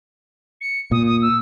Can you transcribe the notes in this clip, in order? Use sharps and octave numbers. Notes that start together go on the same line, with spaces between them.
C#7
A#2 D#6
D#6
E6